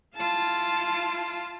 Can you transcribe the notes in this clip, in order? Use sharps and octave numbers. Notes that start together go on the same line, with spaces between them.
E4 F4 F5 A5